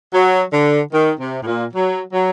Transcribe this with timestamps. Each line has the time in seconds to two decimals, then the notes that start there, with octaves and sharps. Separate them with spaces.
0.13 F#3
0.52 D3
0.92 D#3
1.19 C3
1.41 A2
1.45 A#2
1.73 F#3
2.13 F#3